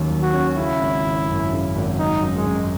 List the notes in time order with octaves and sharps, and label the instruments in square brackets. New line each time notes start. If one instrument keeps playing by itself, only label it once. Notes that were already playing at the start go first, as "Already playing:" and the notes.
Already playing: [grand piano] D#2 D#3 F#3 C#4
F#3
[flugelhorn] F#4
[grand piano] C#4
[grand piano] C#3 [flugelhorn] E4
[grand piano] G#1
G#1
F#2
C#3
G#1
[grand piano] F#3 [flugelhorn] D#4
[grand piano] F#2
[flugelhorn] G#3
[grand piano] F#2